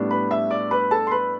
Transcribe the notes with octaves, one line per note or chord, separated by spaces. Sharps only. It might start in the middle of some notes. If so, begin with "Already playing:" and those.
Already playing: A2 G3 B3 D4
B4 B5
E5 E6
D5 D6
B4 B5
A4 A5
C6
B4 B5